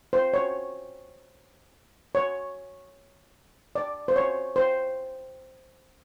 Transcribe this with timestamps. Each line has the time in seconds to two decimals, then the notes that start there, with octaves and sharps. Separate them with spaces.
0.13 C5
0.34 C#5
2.15 C#5
3.75 D5
4.08 C5
4.16 C#5
4.56 C5